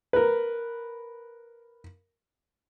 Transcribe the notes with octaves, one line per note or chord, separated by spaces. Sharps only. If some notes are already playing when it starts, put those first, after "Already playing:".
A#4 B4